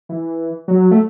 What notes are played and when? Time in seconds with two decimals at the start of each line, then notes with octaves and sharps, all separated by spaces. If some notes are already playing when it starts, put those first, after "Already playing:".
0.09 E3
0.68 F#3
0.91 A3